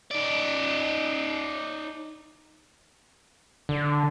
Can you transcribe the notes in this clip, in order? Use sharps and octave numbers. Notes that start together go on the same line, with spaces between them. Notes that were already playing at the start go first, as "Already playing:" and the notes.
D#4 D5
D3